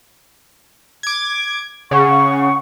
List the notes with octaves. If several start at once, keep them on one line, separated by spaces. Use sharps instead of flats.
D6 G#6
C#3 F#5 C#6